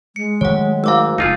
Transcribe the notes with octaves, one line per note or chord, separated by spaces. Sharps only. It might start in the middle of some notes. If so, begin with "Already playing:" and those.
G#3 C#7
D#3 F#3 A3 C#5 F#5
G#1 G#2 F5 D6 E6
F1 C#3 G#3 D#4 F4 G#4